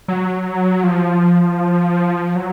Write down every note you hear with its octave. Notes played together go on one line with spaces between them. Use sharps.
F#3
F3
F#3